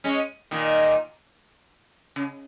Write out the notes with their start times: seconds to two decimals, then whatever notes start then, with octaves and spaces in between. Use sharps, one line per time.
0.04 G#3 C#4
0.51 A#2 D#3
2.16 C#3